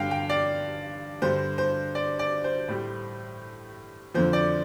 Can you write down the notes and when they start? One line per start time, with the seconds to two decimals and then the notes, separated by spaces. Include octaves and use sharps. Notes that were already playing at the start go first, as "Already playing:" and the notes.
Already playing: G2 D3 G3 F5 G5
0.11 G5
0.30 D5
1.22 G2 D3 G3 C5
1.58 C5
1.95 D5
2.19 D5
2.44 C5
2.68 A2 G3
4.14 F2 D3 F3 C5
4.33 D5